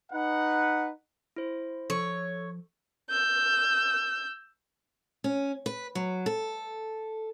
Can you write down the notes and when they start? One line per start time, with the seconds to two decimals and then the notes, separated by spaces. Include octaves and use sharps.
0.12 D#4 B4 F#5
1.36 E4 C5
1.90 F3 A4 C#5
3.09 E6 G6
5.24 C#4
5.66 B4
5.95 F#3
6.26 A4